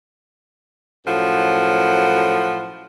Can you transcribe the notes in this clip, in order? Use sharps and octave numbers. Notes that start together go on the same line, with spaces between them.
F#2 A2 F3 F#5